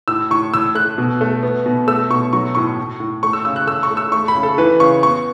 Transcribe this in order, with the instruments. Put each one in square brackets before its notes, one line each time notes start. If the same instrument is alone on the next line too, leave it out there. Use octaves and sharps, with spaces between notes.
[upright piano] A2 E6
A2 C#6
A2 E6
A3 F#6
B2
A3
B3
B2
A3 E6
B2 C#6
F#3 C#6
A2 C#6
A2
A2
A3 C#6
E6
C#3 E6
F#6
A3 E6
C#6
A3
E6
A3 C#6
B5
C#3
A4
E3 B4
C#3 C#6
B3 C#6